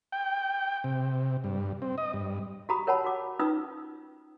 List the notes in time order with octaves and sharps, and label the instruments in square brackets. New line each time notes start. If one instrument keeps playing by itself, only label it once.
[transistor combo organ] G5
C3
G2
C4
D#5
G2
[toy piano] F#4 G4 A#5 B5 D#6
A#4 C#5 F#5 A5 B5
F#4 D6
C#4 D#4 F4 B4 D#6 E6